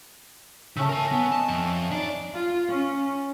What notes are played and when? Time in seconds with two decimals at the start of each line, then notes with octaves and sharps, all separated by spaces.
0.77 C#3 A3 C#4 E6
0.89 A#4 G#5
1.12 B3
1.32 D#5 A5
1.48 F2
1.91 D4 D#4 D5
2.34 F4
2.69 C#4